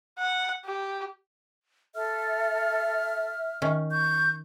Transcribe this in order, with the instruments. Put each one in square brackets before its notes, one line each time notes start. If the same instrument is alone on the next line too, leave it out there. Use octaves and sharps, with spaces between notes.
[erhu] F#5
G4
[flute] A4 [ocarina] E5 [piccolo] F6
[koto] D#3 C#4
[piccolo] C#6 [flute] G6